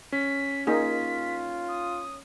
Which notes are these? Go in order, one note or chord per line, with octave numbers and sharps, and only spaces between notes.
C#4 B6
A#3 D#4 F4 G#4 B6
D#6